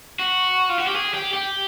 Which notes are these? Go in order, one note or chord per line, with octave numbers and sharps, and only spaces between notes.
F#4
F4
F#4
G4
G#4
G4
G4